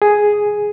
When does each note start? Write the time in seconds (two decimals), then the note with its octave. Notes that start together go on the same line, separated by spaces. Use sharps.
0.02 G#4